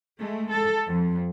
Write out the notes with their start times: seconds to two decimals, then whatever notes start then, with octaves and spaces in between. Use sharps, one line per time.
0.19 G#3 A3
0.51 A4
0.86 F2